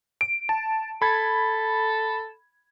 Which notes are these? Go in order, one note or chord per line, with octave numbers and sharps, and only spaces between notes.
D7
A5
A4 B5 G#6